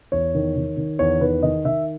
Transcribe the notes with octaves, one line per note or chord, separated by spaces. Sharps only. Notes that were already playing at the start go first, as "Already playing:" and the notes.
E2 C#5
D#3
D#3
D#3
E2 C#5
D#3 B4
D#3 D#5
D#3 E5